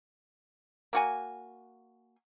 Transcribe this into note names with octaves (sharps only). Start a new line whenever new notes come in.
A#3 F#4 G#5